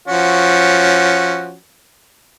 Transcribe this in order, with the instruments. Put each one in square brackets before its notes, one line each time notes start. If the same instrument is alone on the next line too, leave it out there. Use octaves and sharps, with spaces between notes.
[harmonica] F3 C#4 F#4